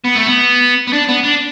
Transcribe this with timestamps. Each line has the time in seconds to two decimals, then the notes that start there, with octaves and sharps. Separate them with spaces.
0.05 B3
0.16 A3
0.27 B3
0.87 B3
0.93 D4
1.09 B3
1.24 D4